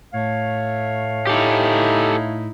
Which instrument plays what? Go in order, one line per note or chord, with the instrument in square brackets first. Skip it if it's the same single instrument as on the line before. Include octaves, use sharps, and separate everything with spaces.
[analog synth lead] A2 [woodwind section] A3 C#5 F5
[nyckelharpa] D#4 E4 [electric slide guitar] G4 A4